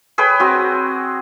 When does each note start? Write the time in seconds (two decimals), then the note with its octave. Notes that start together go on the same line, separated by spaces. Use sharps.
0.18 G#4 B4 C#5 G5
0.40 C4 F#4